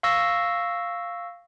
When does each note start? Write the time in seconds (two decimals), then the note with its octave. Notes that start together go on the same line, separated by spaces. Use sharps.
0.03 F5 C#6 E6 A#6